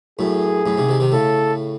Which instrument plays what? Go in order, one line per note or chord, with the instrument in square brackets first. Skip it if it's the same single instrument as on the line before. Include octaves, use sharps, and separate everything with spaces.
[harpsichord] F#2 A2 [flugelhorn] G#4
[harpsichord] F#2 A2
G#2 C3
C3 D#3
C3 D#3
[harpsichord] A2 C#3 [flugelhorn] A4